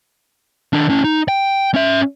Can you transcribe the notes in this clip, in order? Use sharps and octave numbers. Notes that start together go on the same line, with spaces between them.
D#3 D4
C#4 E4
D#4
G5
C#4 E5